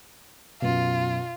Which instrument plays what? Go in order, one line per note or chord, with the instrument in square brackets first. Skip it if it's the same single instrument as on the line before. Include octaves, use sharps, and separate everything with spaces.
[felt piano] F#2 B2 [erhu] F4